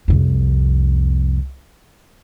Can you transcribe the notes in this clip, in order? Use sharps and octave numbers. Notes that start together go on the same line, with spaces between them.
C2 F2